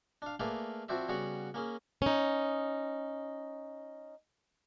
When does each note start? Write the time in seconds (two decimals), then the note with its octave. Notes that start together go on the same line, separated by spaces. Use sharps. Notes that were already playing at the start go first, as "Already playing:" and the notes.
0.22 D4 F5
0.40 A3 A#3 G#4 B4 D5 F5
0.88 F3 C4 F#4 C5 D5 E5
1.09 C#3 G3 B3 F#4 C#5 F#5
1.54 A#3 C#4 G#4
2.02 C#4 D#4